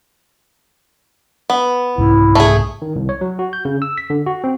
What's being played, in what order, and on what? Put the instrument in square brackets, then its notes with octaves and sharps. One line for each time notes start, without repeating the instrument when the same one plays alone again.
[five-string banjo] B3
[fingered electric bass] C2 G#2 [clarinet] E4
[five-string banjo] A3 G#4
[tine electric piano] D#3
C2
C#5
F#3
F#4
G6
C#3
E6
B6
D3
F#4
C4